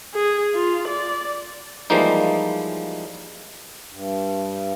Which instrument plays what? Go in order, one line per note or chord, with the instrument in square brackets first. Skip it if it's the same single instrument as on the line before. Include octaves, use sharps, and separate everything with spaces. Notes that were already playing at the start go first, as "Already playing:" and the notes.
[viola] G#4
F4
D5
[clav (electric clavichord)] E3 F3 G3 G#3 A#3 D#4
[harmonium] G2